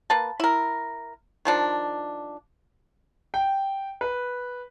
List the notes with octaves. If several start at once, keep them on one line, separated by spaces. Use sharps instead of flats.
A#3 B4 A5
E4 A#4
D#3 F3 D4
G5
B4